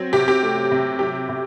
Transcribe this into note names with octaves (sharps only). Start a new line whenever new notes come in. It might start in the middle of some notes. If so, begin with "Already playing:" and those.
Already playing: F#3 C4
C3 G4
G4
A3
C3
F#3 G4
C3